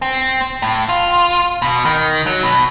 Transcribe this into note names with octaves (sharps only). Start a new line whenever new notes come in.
C4
A2
F4
B2
D#3
F#3
B2